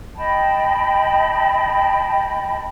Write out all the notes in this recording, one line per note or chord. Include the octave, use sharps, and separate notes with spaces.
D#5 G5 A5 B5